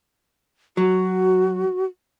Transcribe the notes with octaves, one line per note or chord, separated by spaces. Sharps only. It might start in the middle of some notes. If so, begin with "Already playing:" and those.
F#3 F#4